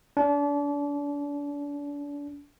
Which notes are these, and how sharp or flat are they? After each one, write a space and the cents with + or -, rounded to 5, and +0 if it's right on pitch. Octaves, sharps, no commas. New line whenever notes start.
D4 -35